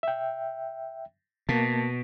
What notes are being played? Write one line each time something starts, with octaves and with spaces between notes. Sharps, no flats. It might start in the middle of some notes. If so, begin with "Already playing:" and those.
E5 G5
B2 A#3 A5